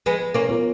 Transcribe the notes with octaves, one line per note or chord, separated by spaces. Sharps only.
F3 G#3 B3
A#3 C#4
B3 F4 A#4 C#5